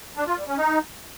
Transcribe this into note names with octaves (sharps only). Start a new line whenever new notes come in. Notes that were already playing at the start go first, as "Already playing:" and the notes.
D4
F4
G3
C#4
D#4